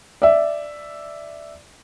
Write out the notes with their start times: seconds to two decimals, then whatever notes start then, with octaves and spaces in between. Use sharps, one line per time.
0.22 D5 E5